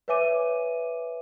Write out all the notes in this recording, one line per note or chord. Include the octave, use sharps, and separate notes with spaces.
B4 C#5 E5 G#5 D6 D#7